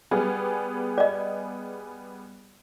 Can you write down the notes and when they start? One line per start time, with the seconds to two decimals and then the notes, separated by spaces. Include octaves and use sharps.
0.11 G3 B3 G#4
0.98 D5 D#5